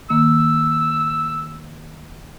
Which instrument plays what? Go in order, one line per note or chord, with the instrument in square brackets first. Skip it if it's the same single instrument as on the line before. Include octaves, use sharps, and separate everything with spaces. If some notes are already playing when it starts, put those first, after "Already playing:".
[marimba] D#3 A#3 [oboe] E6